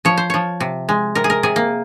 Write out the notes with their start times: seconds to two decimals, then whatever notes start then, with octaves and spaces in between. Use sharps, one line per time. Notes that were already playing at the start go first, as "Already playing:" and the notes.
0.05 F3 C#5
0.17 C5
0.30 F3 C#5
0.60 C3
0.89 G#3
1.15 C3 A#4
1.24 G#4
1.30 A#4
1.43 C3 G#4
1.56 A#3